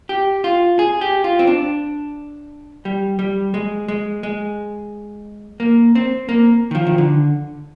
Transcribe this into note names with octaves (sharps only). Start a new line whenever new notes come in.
G4
F4
G#4
G4
F4
C4
D4
G3
G3
G#3
G#3
G#3
A#3
C4
A#3
D#3
F3
D#3
D3